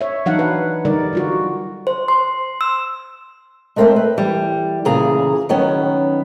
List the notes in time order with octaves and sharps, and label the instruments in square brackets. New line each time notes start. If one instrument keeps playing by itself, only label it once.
[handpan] C#5 E5
E3 F#3 D4 D#4 F5 F#5
B4
D3 G3 D#4 A#4 D5
G3 F4 F#4
[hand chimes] C5
C6
E6
[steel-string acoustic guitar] G#3 A3 C4 A#4 C5 E5
B4
E3 G3
D2 A#2 C#3 E3 G#4 A#5
D#3 F#3 B3 C#4